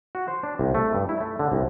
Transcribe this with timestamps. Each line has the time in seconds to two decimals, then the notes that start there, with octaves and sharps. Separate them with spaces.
0.15 F#4
0.28 C5
0.43 D4
0.59 C2
0.75 A3
0.95 G2
1.09 E4
1.21 A3
1.39 D3
1.52 C2